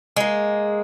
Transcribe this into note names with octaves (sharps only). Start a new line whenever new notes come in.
G#3 A#3